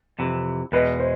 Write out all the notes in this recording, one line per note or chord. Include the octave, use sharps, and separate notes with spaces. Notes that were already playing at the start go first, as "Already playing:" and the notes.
F2 C3 E3
E2 B2 G#3 B4
C5